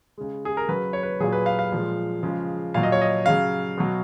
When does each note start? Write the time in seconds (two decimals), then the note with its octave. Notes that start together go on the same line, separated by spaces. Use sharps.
0.18 C#3 G#3
0.45 G#4
0.57 A#4
0.69 C#3 F#3 B4
0.93 C#5
1.03 B4
1.20 A#2 F#3 G#4
1.32 B4
1.46 F5
1.59 F5
1.72 A#2 F3 G#3
2.23 C#3 F3 G#3
2.74 A#2 F#3 F5
2.83 D#5
2.92 C#5
3.01 D#5
3.26 C#3 F#3 F5
3.78 B2 F#3